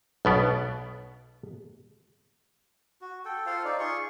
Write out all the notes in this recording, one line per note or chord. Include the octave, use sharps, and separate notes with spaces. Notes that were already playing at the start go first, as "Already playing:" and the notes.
B1 B2 B3 D5
F#4
A4 G5
F4 A4 C5 F5
D#4 D5
F4 G#4 C6 C#6